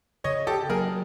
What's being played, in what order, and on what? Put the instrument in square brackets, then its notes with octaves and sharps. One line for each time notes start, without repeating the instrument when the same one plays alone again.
[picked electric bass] C#3 [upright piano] C#5 D#5
[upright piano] G4 A4
[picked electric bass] F#3 A#3 [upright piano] G#4 A#4